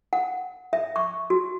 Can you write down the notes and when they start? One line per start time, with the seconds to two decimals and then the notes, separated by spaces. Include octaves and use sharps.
0.13 F#5
0.73 E5
0.96 C#6
1.30 F#4